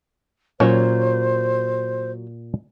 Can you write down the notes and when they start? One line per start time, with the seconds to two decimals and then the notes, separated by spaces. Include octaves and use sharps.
0.60 A#2 F#3 C#4 C5 C#5